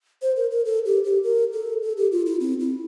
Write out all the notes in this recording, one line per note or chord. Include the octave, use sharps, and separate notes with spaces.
C5
A#4
A#4
A4
G4
G4
A#4
A4
A4
G4
F4
E4
C4
E4